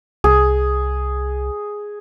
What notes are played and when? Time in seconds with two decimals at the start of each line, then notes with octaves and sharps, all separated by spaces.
0.24 C2 G#4